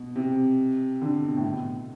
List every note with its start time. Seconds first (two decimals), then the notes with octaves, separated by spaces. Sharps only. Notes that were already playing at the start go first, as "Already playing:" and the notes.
Already playing: B2
0.16 C3
1.02 D3
1.23 B2
1.37 A2
1.44 B2